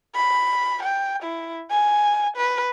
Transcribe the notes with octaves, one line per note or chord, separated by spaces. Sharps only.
B5
G5
E4
G#5
B4